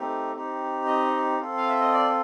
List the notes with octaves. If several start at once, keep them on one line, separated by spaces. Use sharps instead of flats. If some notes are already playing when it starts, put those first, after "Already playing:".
Already playing: A3 C4 D#4 G4
C4 D#4 G4
D#5
C4 F4 A4
F5
E5
D#5
D5